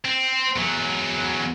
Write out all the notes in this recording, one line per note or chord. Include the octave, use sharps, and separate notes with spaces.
C4
E2 F#3